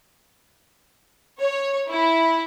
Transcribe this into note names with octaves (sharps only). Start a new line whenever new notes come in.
C#5
E4